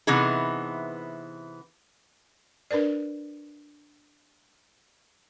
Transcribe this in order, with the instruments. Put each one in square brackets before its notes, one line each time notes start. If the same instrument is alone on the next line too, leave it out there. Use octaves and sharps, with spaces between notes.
[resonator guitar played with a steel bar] C3 E3 B3 D#4 G#4
[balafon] D4 A#4 B4 D5